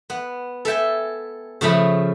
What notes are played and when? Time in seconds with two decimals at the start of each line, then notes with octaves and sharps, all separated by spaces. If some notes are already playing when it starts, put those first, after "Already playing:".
0.10 B3
0.65 A4 E5 G5 G#5
1.61 C#3 F3 A3 B5